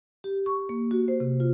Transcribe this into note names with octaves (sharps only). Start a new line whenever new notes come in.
G4
C#6
A#3
F#4
C5
C3
F4